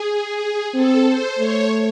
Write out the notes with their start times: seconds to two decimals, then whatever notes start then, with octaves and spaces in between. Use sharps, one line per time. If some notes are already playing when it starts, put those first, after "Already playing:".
Already playing: G#4
0.74 C4 A4
1.06 C5
1.38 A3 C#5